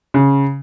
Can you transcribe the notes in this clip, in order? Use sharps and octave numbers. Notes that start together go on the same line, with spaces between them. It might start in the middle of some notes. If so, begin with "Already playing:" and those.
C#3